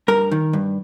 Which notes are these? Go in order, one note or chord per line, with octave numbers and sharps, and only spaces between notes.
G2 A#4
D#3
G2